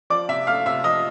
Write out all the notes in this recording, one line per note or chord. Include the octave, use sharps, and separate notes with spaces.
F3 D5 D6
C3 E5 E6
A3 F5 F6
C3 E5 E6
F3 D#5 D#6